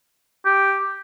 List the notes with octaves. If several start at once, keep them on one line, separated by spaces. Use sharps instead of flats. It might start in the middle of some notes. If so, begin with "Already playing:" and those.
G4